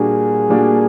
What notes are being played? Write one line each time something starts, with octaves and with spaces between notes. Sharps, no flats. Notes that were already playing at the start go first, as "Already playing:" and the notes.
Already playing: A#2 G3 A#3 D4 F#4 G#4
A#2 G3 A#3 D4 F#4